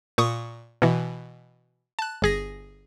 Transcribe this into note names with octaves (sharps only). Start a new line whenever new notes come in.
A#2 C#6 D#6
B2 E3
A5 F#6
G1 G#4 A#6